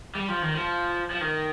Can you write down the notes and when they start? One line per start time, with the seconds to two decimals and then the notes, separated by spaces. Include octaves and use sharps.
0.15 G3
0.28 F3
0.42 D#3
0.55 F3
1.11 F3
1.21 D#3